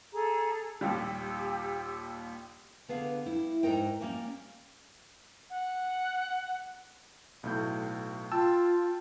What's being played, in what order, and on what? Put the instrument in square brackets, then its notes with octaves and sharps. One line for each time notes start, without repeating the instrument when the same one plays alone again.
[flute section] G#4 A4 A#5
[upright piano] A#1 D#2 G3 [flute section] G4 E6
[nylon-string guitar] D3 B3 G#4 F5
G3 E4
G#2 D#4 A#4 G5
G3 A#3 C#4
[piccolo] F#5
[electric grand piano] B1 A2 G6
[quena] F4 [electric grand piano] G5 A5 E6